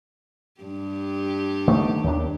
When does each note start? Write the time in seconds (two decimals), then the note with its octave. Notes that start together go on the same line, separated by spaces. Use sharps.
0.61 G2 G4
1.67 D#3 A3 B3
2.04 D#2 D#3 D4